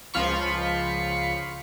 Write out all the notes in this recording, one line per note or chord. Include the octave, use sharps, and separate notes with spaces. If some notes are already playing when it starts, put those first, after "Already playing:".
C#2 F3 F4 B5 C#6